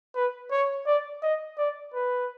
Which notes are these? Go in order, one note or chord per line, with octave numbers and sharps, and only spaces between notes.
B4
C#5
D5
D#5
D5
B4